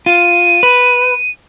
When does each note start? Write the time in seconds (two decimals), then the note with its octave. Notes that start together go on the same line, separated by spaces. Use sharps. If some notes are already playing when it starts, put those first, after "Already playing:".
0.06 F4 D#7
0.63 B4